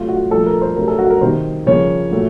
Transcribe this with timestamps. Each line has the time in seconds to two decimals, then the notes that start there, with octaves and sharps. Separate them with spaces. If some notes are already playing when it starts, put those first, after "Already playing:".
Already playing: C3 F#3 A3 F4
0.09 F#4
0.31 A#2 F3 A3 A4
0.46 A#4
0.62 C5
0.76 C3 F#3 A3 A#4
0.88 A4
0.99 F#4
1.10 A#4
1.21 C3 D#3 A#3 C5
1.66 C#3 F3 A#3 C#5
2.11 A#2 F#3 A3